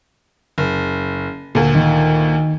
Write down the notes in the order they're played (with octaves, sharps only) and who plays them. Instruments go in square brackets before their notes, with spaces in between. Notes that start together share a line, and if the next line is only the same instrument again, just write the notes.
[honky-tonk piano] F#1
D2 A#2
[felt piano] D#3